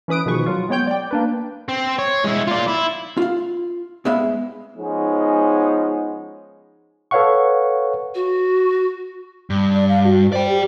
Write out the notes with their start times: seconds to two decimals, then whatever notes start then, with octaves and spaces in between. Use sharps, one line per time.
0.08 E3 C#4 B4 D#6 D7
0.26 B2 D#3 F3 G#4 B4 C#6
0.46 F#3 F4
0.69 G#3 B3 C#5 G5 G6
0.87 D5 G5
1.11 A#3 D4 B4
1.69 C4
1.98 C#5
2.24 G#3 E4
2.47 F4 D5
2.68 E4
3.17 F4 F5
4.05 G#2 G#3 B3 E5 F5 B5
4.77 F3 G#3 B3 C#4 D#4
7.11 A4 B4 C#5 F5 F#5 C#6
8.14 F#4
9.50 G2
9.74 D5
9.89 F5
10.05 F#4
10.33 C5 D5 G5
10.49 G4